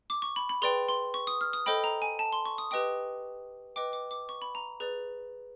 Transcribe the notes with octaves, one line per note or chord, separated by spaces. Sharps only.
D6
C#6
B5
B5
G#4 B4 D5 G5 C6
C6
C#6
D#6
F6
D#6
A4 C5 D#5 G5 B5
A#5
G#5
A5
C6
C#6
D#6
G4 B4 D#5 G5 D#6
B4 D#5 G5 D6
D6
D6
C#6
B5
A#5
G#4 B4 D5